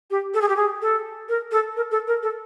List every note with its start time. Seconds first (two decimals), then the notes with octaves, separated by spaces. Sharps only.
0.11 G4
0.34 A4
0.42 G#4
0.49 G4
0.57 G#4
0.82 A4
1.29 A#4
1.52 A4
1.77 A#4
1.91 A4
2.07 A#4
2.23 A4